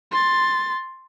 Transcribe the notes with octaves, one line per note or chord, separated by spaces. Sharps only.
C6 A6